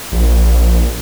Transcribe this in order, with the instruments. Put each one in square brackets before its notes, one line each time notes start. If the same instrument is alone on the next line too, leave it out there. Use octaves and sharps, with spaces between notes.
[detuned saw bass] A#1